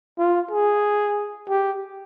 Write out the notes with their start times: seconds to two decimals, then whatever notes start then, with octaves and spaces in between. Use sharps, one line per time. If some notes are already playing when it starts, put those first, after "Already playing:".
0.19 F4
0.51 G#4
1.49 G4